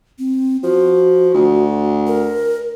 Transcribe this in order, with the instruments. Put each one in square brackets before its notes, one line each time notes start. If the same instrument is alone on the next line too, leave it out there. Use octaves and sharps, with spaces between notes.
[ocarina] C4
[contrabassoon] F3 [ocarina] F#4
[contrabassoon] D2
[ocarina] A#4